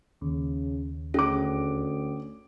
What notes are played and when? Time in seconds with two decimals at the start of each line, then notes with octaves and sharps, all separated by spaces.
0.22 D#2 C#3
1.14 D2 C#4 G#4 D6